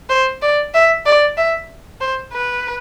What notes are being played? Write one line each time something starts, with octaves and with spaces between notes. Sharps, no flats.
C5
D5
E5
D5
E5
C5
B4